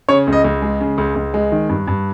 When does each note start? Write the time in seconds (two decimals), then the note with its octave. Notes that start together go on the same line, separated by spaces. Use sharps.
0.09 C#3 C#5
0.27 C#2
0.33 D#5
0.44 C#2
0.62 G#3
0.81 C#3
0.98 C#2
1.15 C#2
1.34 G#3
1.52 D#3
1.69 G2
1.88 G2